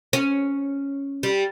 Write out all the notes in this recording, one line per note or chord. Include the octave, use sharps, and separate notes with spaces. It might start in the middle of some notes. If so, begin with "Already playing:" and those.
C#4
G3